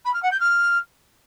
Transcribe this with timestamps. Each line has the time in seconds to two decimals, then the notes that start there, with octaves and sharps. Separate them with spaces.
0.05 B5
0.14 F6
0.23 F#5
0.31 G6
0.40 F6